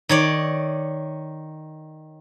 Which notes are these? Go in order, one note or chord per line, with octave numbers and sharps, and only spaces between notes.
D#3 C#5 D5